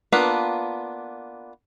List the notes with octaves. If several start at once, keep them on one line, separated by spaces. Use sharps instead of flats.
A#3 B3 D4 F4 B4